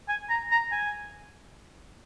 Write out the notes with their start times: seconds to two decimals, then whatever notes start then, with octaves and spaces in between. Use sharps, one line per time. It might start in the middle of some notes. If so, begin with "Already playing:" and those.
0.09 G#5
0.29 A#5
0.51 A#5
0.72 G#5